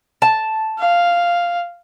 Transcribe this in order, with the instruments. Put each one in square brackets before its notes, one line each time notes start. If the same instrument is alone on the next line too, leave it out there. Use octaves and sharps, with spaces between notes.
[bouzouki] A5
[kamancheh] F5